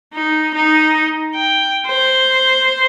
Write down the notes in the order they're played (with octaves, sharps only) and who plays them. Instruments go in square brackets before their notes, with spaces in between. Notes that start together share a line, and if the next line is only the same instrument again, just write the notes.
[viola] D#4
D#4
G5
C5